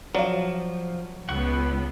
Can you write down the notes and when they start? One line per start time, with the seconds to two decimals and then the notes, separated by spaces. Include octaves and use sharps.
0.15 F3 F#3 D5 F5
1.29 C#2 B3 F#5 C#6